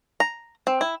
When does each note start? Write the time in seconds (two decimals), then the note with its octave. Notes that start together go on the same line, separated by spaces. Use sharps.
0.20 A#5
0.67 C4
0.81 E4